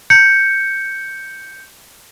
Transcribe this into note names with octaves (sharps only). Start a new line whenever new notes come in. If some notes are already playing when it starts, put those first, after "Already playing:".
G6 C#7